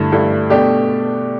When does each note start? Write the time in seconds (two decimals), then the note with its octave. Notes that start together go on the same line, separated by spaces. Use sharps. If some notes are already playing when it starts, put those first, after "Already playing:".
Already playing: G2 D3 A3 E4
0.12 G2 D3 A3 E4
0.50 B2 A3 D4 G4